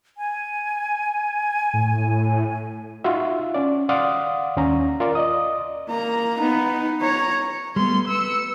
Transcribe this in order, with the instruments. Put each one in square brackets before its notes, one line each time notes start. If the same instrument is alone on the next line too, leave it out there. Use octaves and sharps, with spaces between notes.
[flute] G#5
[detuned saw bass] A2
[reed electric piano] D#4 F4 F#4 E5
C#4 D5
D5 F5 F#5 C6 D#6
D#2 C#4 A#5
F4 A#4 D5
D5 D#5 D#6
[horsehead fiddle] A#3 A#5
B3 D#4
C#5 A#5
[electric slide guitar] G3 A3 B3 [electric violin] C6
[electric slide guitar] B4 [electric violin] E6 C#7